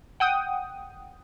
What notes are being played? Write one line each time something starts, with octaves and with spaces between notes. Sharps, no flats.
F#5 G5 D#6